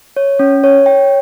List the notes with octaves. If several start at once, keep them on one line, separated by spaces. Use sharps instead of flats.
C#5
C#4
C#5
G5